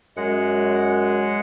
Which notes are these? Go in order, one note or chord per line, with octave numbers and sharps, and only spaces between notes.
F#2 G#3 F#5